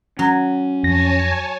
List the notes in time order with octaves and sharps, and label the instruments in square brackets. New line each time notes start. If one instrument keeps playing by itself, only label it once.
[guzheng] F#3 [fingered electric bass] C#4
[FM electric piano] F2 A#6 [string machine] C#5 G#5 A5